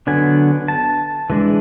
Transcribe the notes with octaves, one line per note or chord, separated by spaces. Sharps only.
D3 F#3 B3 D4 G#5
A5
E3 G#3 D4